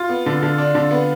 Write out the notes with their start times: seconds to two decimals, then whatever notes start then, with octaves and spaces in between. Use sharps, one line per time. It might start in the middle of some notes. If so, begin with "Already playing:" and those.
Already playing: F4
0.09 B3
0.26 D3
0.43 D3
0.58 D4
0.75 D3
0.91 B3